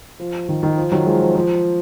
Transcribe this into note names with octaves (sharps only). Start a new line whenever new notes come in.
F3
D#3
D#3
F3
D#3 F#3
F3 G#3
F3
F3